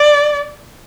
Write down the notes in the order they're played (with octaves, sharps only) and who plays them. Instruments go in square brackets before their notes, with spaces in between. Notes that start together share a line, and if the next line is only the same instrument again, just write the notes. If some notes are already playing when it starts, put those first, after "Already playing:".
Already playing: [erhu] D5